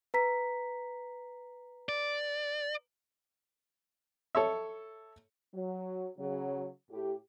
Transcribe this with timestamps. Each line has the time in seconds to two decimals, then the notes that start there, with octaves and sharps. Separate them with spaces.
0.14 B4 A#5 B6
1.89 D5
4.35 A4 C#5 E5
5.54 F#3
6.18 C#3 F#3
6.90 A2 G4